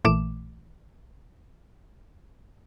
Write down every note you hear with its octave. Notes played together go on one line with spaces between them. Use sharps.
A#1 A#2 E3 A3 D6 E7